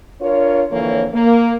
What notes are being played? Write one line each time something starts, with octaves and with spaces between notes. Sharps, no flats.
D4 F4 A#4 C#5
F2 D3 E3 A#3 C#5
A#3